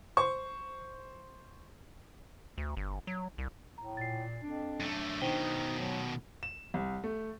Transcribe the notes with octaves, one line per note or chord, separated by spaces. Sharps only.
C5 C#6
D2
G1
F#3
C2
A2 A#5
A#2 A6 C7
F2 D4
F#2 A3
B2 D#3 D#4 C5 G5 G7
F#3
E7
C2
A3